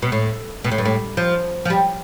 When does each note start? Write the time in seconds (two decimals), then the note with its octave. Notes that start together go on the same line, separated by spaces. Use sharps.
0.02 B2
0.12 A2
0.64 B2
0.72 A2
0.78 G2
0.85 A2
1.17 F3
1.65 F3
1.70 G3